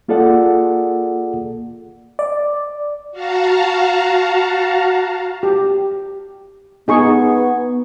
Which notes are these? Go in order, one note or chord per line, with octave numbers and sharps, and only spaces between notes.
A#3 F4 G#4 A4 D5 F#5
D5
F#4 F5 A5 A#5
G4
B3 D#4 G#4 C#6